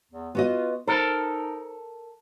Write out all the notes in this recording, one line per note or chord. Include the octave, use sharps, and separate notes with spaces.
E2
B3 F4 F#4 D#5
D#4 A4 A#4 C5